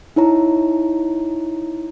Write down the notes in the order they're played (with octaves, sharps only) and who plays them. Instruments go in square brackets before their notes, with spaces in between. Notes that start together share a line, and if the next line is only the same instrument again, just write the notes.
[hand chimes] D#4 E4 C#5 A#5